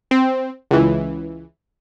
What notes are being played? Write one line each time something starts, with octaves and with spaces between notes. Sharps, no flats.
C4
C#2 E3